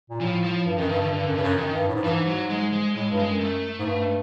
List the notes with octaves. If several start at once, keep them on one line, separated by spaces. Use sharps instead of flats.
A#2
A2 F3
F3
G2
F#2 D#3
G2 D#3
G2 D3
G2 D3
F#2
G2 C#3
F#2
F#2 D#3
G2
A2
G#2
G2 E3
G#2
F#3
G#3
G#3
A2 G#3
G2
G#3
F#2
A3
G#2
G2